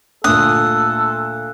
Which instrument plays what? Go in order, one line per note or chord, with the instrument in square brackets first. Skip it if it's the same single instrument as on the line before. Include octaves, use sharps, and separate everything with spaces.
[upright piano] D2 A#2 [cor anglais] A4 [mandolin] D#6 [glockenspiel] F#6